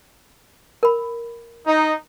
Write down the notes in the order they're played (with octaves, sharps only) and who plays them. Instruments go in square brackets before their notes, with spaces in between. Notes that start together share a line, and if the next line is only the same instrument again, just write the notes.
[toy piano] A#4 B5
[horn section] D#4